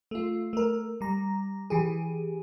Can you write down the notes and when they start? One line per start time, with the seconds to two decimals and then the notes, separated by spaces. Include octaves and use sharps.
0.11 A3 F4
0.53 A3 A#4
1.01 G3 A#5
1.70 E3 G4 G#4